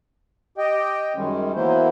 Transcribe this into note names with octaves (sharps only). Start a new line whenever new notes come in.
G4 D#5 G5
F#2 D#3 G3 G#3 C#4
E3 F#3 A#3 B3 E4 C5